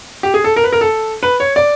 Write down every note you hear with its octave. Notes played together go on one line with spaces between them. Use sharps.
G4
G#4
A4
A#4
B4
A#4
A4
B4
C#5
D5